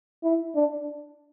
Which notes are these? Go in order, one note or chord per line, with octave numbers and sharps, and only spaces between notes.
E4
D4